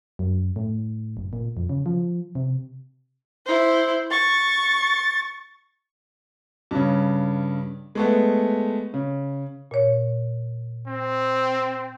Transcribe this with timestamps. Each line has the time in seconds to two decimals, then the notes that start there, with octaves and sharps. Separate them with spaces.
0.19 F#2
0.56 A2
1.17 F#1
1.33 A#2
1.57 F2
1.69 C#3
1.86 F3
2.35 C3
3.46 E4 C5
4.11 C#6 A6
6.71 G2 C#3
7.95 G#3 A3 B3
8.94 C#3
9.71 A#2 C#5
10.88 C4